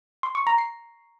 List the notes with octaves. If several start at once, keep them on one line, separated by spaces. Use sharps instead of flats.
C6
C#6
A#5
C7